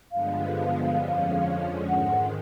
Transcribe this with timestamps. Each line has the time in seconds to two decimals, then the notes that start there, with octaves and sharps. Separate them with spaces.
0.12 G2 D3 F3 G#3 B3 F5
1.01 F2 D3 F3 G#3 C#4
1.88 G#2 D#3 G#3 F#5